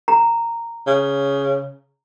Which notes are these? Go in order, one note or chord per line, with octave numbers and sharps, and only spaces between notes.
A#5
C#3